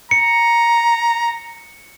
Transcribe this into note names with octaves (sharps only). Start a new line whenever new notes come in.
A#5 C#7